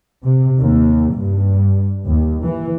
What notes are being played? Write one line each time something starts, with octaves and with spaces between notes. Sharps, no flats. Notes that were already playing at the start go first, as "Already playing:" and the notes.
C3
D#2
G2
D#2
E3